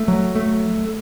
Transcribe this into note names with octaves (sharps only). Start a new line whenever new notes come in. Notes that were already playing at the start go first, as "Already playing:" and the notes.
Already playing: A3
F#3
A3